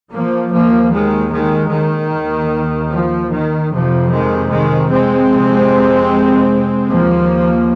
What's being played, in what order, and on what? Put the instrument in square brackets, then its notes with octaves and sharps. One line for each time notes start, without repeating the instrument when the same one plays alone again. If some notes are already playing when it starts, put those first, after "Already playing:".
[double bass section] F3 A#3
D#2 F3 A#3
D#3 G#3
D#3 G#3
D#3
D#2
F3
D#3
F2 C3 F3
D#3 G#3
D#3 G#3
G#3 C4
F2 C3
D#2 F3 A#3